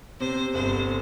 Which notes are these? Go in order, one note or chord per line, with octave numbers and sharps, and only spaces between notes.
C3 C5
G1 C5